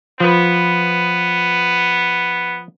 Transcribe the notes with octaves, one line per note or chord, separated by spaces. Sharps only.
F3 B3 B4